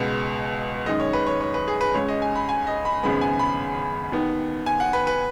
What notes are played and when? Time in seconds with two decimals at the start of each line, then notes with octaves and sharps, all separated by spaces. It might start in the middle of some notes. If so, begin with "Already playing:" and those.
Already playing: C#2 B2 G#3 B3
0.86 F#2 D#3 G#3 D#5
1.00 C#5
1.13 B4
1.27 C#5
1.41 C#5
1.54 B4
1.68 G#4
1.81 B4
1.94 C#2 C#3 G#3 C#5
2.08 D#5
2.22 G#5
2.36 B5
2.49 G#5
2.67 D#5
2.85 B5
3.03 G#1 F#2 C#3 G#3 B3 B5
3.21 G#5
3.39 B5
4.12 D#2 D#3 B3
4.66 G#5
4.80 F#5
4.93 B4
5.07 B4